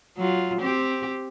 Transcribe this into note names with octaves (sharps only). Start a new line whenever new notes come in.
F#3 F4
C4 G4